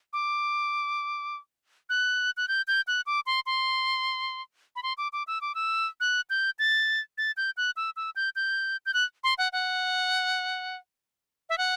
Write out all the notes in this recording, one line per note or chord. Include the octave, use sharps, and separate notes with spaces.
D6
F#6
F#6
G6
G6
F#6
D6
C6
C6
B5
C6
D6
D6
E6
D6
E6
F#6
G6
A6
A6
G6
F#6
E6
E6
G6
G6
G6
F#6
C6
F#5
F#5
E5
F#5